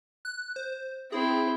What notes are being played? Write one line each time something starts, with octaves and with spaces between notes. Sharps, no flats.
F#6
C5
C4 E4 G#4